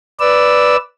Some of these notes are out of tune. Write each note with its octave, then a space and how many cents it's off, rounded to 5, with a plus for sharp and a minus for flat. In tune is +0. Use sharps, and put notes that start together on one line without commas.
B4 +0 D5 +0 E6 +0